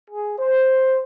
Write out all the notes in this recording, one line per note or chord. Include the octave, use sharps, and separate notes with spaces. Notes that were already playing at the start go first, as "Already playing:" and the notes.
G#4
C5